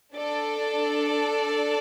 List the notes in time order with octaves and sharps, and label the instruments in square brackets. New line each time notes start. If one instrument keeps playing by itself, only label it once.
[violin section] D4 A4 D5